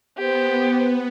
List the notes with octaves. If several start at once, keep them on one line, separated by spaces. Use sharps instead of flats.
B3 G4 C5